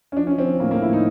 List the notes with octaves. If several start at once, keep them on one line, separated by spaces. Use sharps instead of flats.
C#4
F3 D4
C#4
F3
C4
F3
A2 A#3
A#3
F3
E4
A2 D#4